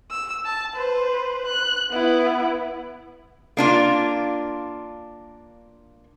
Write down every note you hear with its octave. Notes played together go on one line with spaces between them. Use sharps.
E6
A5
B4 C5
F#6
B3 E4
A#3 D4 F4